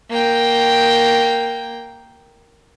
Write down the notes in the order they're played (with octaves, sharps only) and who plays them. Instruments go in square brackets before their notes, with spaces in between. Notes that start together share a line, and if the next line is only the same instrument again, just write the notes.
[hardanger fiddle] A#3 G5